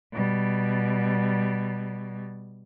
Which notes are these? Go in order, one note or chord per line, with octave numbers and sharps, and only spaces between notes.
B2 G3